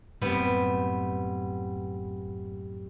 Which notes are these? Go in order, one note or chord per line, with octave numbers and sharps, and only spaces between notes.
F#2 A2 G3 B3 C4